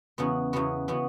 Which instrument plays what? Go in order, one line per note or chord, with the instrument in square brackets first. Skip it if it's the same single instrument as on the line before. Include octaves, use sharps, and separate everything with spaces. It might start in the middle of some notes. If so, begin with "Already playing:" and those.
[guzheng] E2 C#3 E3 B3 F#4
E2 C#3 E3 B3 F#4
C#3 E3 B3 F#4